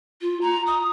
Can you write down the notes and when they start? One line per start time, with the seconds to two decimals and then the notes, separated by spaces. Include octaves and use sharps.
0.22 F4
0.41 A#5
0.67 D#6